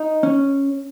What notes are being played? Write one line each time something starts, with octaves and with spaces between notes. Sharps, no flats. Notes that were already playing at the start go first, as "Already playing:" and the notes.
Already playing: D#4
C#4